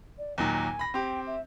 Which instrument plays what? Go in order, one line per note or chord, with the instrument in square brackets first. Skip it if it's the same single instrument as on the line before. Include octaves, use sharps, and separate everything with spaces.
[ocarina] D5
[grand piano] D#2 A#2 F#3 [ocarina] G#5
[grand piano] B5 A#6
[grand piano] C4 G4 [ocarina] G5
[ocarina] E5